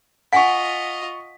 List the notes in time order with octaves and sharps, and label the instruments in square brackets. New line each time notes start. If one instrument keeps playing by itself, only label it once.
[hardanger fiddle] F4 D#5 [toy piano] F#5 G#5 [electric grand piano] C#6 B6